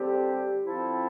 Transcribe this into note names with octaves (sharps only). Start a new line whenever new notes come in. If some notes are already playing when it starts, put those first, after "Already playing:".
Already playing: D3 G3 C4 G4 C5
F3 C4 E4 A4